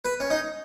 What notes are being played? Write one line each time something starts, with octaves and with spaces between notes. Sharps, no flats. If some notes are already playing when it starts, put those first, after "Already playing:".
B4
C#4
D#4